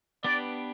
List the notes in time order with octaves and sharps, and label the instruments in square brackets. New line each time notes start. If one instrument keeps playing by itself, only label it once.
[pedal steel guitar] B3 D4 G4 B4 [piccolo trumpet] D5